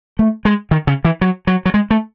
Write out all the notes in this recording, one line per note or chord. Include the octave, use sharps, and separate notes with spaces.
A3
G#3
D#3
C#3
E3
F#3
F#3
F#3
G#3
A3